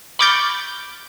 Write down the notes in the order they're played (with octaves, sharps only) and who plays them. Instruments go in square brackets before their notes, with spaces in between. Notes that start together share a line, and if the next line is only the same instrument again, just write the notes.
[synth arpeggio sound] B5 C#6 D6 F6 G6 A6